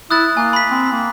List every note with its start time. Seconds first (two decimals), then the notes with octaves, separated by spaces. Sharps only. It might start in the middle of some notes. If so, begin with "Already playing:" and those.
0.11 E4 D#6 F#6 A6
0.37 A#3 G#5
0.53 B5 B6
0.70 C4
0.92 A#3